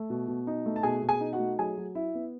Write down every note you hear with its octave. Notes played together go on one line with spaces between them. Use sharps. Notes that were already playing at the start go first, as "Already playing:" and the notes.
Already playing: A3
B2
B2
D#4
A3
A5
B2 G#4 G#5
B2
G#4 G#5
D#4
F#4 F#5
A3
F#3 G#4 G#5
F#3
E4 E5
B3